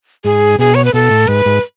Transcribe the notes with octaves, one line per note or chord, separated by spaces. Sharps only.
G#2 G#4
B2 G#4
C#5
B4
B2 A4
A2
G#2 B4
G#2